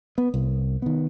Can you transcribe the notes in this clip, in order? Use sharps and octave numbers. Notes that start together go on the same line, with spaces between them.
B3
C2
D#3 B3